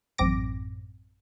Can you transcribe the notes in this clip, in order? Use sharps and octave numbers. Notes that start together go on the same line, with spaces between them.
A1 F#2 C4 D6 A#6 D7